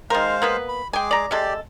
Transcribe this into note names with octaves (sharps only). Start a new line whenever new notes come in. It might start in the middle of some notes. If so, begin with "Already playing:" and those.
D#3 G#3 A#4 C5 F5
A#3 B3 B4
B5
G#3 G#4 G5 G#5 D6
D5 A#5
C3 G#3 G4 A4 D5